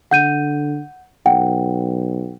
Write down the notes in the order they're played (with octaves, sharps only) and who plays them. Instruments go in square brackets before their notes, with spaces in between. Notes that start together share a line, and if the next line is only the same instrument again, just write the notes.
[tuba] D3 [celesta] F#5 G6 D#7
[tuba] B1 [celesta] F#5 G5